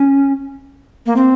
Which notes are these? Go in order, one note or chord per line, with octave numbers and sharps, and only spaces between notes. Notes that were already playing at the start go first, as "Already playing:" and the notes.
Already playing: C#4
A#3
C4